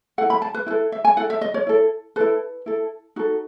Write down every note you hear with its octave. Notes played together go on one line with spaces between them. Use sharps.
E4 A4 F#5
B5
A5
B4
E4 A4 B4
E5
G#5
E4 A4 F#5
E5
D#5
C#5
E4 A4
E4 A4 B4
E4 A4
D#4 F#4 A4